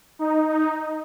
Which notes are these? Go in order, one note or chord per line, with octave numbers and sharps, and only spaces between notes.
D#4
D#4